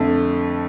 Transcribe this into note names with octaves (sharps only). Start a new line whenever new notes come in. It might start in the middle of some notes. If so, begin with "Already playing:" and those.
Already playing: F2 D3 A3